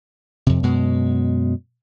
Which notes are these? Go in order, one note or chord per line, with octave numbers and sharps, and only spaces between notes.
F2 C3
F#2 B2 G#3